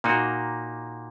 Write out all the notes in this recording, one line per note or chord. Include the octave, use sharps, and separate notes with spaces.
A#2 A#3 D#4 F#4